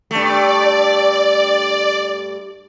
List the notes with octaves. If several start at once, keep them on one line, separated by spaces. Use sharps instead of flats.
G2 A3 D5